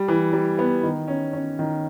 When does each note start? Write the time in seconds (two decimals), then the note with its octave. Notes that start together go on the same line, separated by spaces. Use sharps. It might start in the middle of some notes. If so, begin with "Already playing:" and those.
Already playing: G3
0.08 E3
0.33 G3
0.59 B3
0.83 D#3
1.08 C#4
1.33 C#4
1.59 D#3